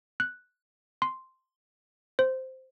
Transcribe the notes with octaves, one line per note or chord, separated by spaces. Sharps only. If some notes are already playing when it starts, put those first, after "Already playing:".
F#6
C6
C5